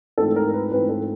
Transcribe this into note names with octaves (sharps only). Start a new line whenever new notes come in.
G#2 E3 A3 C4 F4 A4
A#4
B4
G#2 E3 A3 C4 F4 B4
A4